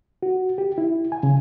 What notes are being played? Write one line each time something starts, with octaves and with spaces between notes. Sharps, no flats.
F#4
G4
E4
G#5
C#3